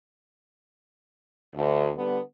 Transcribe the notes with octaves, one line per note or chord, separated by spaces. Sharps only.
D2
D3 G3 B3